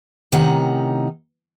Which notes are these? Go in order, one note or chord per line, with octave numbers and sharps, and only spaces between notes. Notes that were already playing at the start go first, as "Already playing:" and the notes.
A2 C3 D#3 C#4 D#4 F#5